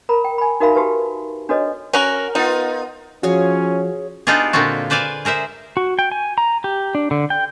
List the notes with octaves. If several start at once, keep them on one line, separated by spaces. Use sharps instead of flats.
A#4 A#5 B5
G5
G#5 B5
D#4 F#4 A#4 E5 F5 B5
F#4 G4 B4 A5
D4 F#4 A4 B4 C#5 D#5
C#4 F#4 A#4
B3 D#4 F4
F3 C#4 F#4 G#4 C#5 F5
B3 D4 D#4 F4 G4 G#4
A#2 D3 C4 F4 F#4
B4 C5 D5 F5 G#5
G#4 A#4 C5 E5
F#4
G5
G#5
A#5
G4
D4
D3
G5